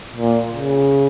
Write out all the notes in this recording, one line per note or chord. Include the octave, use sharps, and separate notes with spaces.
A#2
C#3